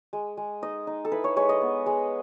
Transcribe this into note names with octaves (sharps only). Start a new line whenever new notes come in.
G#3
G#3
D#4 D#5
D#4
A4
E4 B4
C#5
G#3 C#5
D#5
B3
G#3